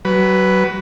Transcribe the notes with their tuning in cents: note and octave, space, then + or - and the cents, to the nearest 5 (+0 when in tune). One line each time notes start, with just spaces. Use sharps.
F#3 +30 B4 +0